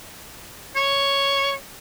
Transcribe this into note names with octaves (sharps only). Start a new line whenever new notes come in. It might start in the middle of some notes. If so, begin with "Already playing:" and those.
C#5